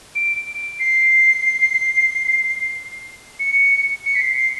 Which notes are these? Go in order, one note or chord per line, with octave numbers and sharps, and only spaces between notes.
D7
C7
C#7
C#7
B6
C7
C7